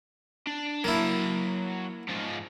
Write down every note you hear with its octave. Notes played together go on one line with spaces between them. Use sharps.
D4
F#3 A#3 E4 A5
G#2 F3